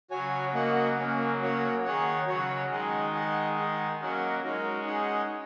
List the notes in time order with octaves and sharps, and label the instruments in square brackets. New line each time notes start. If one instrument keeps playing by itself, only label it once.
[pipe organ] C#3 F#3 [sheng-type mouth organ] F#4 C#5 G#5
[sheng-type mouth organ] A#3 F#4 D#5 F#5
A#3 C#4 A#4
A#3 F#4 C#5 F#5
[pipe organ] D#3 [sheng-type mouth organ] G#4 C#5 F#5
[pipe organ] C#3 F#3 [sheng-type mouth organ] F#4 C#5 F#5
[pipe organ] D#3 G#3 [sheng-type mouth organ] G#4 D#5 F#5
[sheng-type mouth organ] G#4 D#5 F#5
D#4 G#4 F#5
[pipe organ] F#3 A#3 [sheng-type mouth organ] C#4 A#4 D#5 F#5
[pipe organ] G#3 C#4 [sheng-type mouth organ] D#4 F#4 A#4
[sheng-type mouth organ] D#4 G#4 D#5 F#5